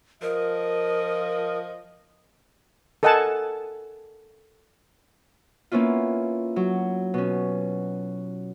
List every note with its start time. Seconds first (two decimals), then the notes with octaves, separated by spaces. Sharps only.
0.22 F3 A#4 D#5
3.03 A4 A#4 D#5 F#5 G#5 A5
5.72 A#3 B3 C#4 E4 F4
6.56 F#3
7.14 B2 C#4